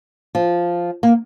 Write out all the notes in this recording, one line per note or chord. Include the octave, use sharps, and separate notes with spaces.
F3
A#3